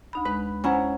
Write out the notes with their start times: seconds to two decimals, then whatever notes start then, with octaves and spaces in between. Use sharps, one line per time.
0.13 D2 D#4 B5
0.25 G#3 B4
0.64 C#4 E4 C5 F#5 G#5 A#5